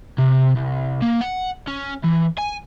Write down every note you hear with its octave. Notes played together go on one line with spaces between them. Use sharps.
C3
C2
A#3
F#5
C#4
E3
G#5